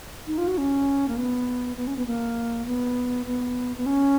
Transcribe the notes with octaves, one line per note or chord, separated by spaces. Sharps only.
D#4
F4
F#4
C#4
A#3
B3
B3
C#4
B3
A#3
B3
B3
B3
C#4